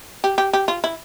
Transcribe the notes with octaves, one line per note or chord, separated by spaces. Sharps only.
G4
G4
G4
F4
E4